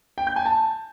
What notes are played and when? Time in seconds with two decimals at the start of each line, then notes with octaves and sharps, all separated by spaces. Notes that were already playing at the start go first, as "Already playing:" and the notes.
0.18 G5
0.27 G6
0.36 G#5
0.46 A5